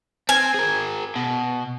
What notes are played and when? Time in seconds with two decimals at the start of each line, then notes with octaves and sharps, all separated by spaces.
0.29 C4 G#5
0.54 G#4 A#4
1.16 B2